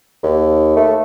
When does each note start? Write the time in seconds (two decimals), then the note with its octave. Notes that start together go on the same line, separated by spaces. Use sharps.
0.23 D#2
0.76 A3